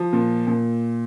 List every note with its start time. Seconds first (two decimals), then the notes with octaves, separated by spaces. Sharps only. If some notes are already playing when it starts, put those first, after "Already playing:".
Already playing: F3
0.13 A#2
0.47 A#2